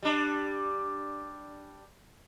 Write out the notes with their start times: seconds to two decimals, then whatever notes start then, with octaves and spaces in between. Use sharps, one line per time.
0.03 G3 D4